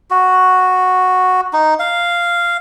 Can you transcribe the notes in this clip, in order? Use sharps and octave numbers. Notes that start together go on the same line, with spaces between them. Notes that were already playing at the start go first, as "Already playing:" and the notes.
F#4
D#4
F5